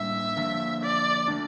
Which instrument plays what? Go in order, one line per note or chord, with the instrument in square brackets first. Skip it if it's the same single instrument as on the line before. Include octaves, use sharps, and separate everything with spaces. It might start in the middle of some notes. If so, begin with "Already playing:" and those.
Already playing: [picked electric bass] A2 G3 A#3 D4 [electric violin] E5
[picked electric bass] D3 F3 A#3 D4
[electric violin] D5
[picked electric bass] A3 D4